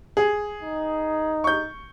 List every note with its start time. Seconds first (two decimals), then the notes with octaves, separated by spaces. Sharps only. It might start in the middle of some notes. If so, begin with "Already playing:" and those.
0.17 G#4
0.62 D#4
1.44 C#6 G6